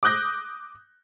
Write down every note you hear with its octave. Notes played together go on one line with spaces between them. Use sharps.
D6 D#6 F#6 G6 A#6